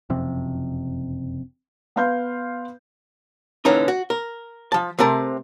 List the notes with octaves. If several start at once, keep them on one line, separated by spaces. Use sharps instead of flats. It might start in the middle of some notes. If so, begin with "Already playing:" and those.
F#1 F2 C3
B3 B4 F5 C6 G6
A#2 D3 E3 C#4 D#4 A#4
F#4
A#4
F3 A5
C3 A3 C4 A#4 A5